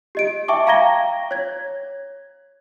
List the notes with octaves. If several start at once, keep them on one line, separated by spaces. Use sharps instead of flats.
G4 D#5 D7
E5 G5 A5 C#6 D6
F5 G5 A#5 G#6 A#6 G7
C#5 G#6